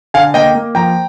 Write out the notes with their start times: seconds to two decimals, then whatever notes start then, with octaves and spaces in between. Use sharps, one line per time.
0.14 D3 F5 G#5
0.34 A#3 D#5 G5
0.55 A#3
0.75 F3 G5 A#5